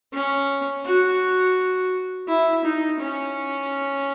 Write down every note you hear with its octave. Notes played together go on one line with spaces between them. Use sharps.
C#4
F#4
E4
D#4
C#4